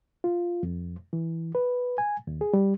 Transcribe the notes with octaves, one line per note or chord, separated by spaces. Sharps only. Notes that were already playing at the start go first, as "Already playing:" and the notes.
F4
F2
E3
B4
G#5
D#2
G#4
G3